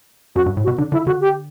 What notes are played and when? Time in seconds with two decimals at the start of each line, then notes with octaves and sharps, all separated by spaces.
0.36 F#2 F#4
0.46 G2
0.57 A2
0.64 F#4
0.68 B2
0.78 D3 D4
0.92 D3 E4
1.07 D3 F#4
1.21 G4